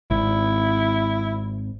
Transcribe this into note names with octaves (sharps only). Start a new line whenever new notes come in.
G#1 E4